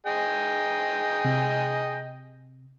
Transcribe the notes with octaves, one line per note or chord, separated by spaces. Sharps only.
G#4 D#5 G5
C3